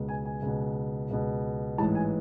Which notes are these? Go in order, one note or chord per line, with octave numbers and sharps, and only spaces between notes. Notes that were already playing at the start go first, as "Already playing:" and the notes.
Already playing: C#2 B2
G#5
G#5
C#2 B2
C#2 B2
A1 G#2 E3 A5
G#5